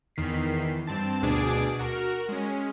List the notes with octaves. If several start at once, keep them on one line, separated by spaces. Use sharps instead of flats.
E2 D#3 B6 C7
G2 C4 A5
D2 B2 D4 G#4 D6 D7
F#4 A#4
G#3 C#4